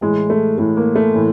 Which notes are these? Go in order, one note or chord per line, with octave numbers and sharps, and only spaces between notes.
A2 E3 G#3
A3
A2 E3 A3
A#3
A3
A2 E3